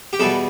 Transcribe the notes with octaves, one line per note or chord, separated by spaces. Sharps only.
G4
E2 B2 G3 A4